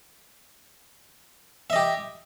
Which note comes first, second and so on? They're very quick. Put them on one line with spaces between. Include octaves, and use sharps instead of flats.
E5 D#5 G4